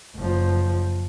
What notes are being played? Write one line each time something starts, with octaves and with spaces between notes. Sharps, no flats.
F#1 F3